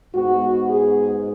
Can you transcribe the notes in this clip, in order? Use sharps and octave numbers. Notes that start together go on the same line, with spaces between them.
G#2 G#3 B3 F#4
G#4